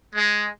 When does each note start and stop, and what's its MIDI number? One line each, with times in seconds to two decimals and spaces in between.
0.15 0.48 56